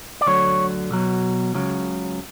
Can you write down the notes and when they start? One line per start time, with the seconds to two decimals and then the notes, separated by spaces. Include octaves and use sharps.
0.21 D5
0.26 D2 D3 F#3 C#5
0.91 B1 B2 F#3
1.54 C#2 C#3 F#3